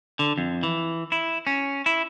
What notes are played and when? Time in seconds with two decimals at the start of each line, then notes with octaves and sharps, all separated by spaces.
0.19 D3
0.38 F2
0.63 E3
1.12 E4
1.47 C#4
1.86 E4